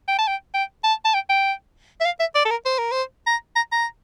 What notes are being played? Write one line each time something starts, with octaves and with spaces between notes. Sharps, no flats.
G5
A5
G5
G5
A5
A5
G5
G5
E5
F5
E5
D5
A4
A#4
C5
A#4
C5
A#5
A#5
A#5